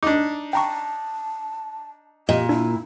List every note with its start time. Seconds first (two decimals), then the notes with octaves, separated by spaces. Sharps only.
0.03 D4 D#4 D6
0.53 G5 A5 A#5 C#6
2.29 A#2 G4 D#5
2.49 D4 E4